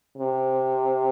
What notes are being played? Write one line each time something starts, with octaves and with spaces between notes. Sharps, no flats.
C3